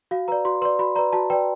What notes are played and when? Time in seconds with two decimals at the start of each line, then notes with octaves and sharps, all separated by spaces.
0.11 F#4 F5
0.28 B4 D5 A#5
0.45 F#4 C6
0.62 B4 C6
0.65 D5
0.79 F#4 B5
0.96 B4 D5 A#5
1.13 F#4 A5
1.30 B4 D5 G5